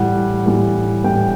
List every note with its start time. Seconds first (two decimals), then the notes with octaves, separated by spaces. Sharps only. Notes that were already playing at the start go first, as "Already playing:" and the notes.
Already playing: A2 E3 G3 F#5
0.46 A2 E3 G3
1.04 A2 E3 G3 G5